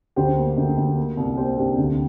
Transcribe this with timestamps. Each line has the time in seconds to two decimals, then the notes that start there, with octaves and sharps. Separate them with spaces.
0.16 D2 G4 C5
0.37 A#3
0.57 D2
0.77 D2
0.97 A#3
1.17 C2
1.37 A#3 G4 C5
1.57 C3 D4 G4
1.78 D2